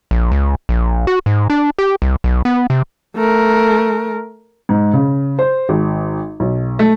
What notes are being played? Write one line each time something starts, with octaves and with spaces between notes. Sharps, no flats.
A#1
C#2
A#1
F#4
G#2
D4
G4
C2
B1
B3
C3
A3 A#4
G#2
C#3
C5
G#1
B1
A3